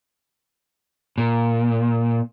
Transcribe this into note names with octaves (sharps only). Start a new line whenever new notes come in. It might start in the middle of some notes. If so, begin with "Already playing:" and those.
A#2